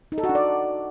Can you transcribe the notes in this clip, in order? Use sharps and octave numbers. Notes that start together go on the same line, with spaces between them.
D#4
A4
F#4
D4
D5